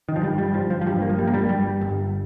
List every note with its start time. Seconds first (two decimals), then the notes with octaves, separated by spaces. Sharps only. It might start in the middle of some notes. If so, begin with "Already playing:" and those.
0.09 D#3
0.16 F3
0.23 G2 G3
0.38 G3
0.54 G1 F3
0.70 F3
0.81 F3
0.86 G2 G3
1.02 A#3
1.09 F3
1.18 G1 G3
1.27 A#3
1.34 G3
1.49 G2 G3
1.81 G1